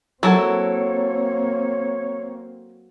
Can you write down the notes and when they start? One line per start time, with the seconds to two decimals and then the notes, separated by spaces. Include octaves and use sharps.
0.23 F#3 A#3 C4 E4 A4 A#4 C#5